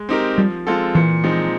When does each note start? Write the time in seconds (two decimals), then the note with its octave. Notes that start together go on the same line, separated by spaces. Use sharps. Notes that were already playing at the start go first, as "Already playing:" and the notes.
Already playing: G#3
0.09 C4 D#4 G4 A#4
0.38 F3 G3
0.67 G#3 C4 F4 A4
0.95 A#2 E3
1.24 F3 G#3 C4 D#4